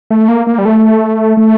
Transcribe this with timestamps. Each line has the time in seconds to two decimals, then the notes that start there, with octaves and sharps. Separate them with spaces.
0.10 A3
0.28 A#3
0.47 A#3
0.58 G3
0.65 A3
1.37 A3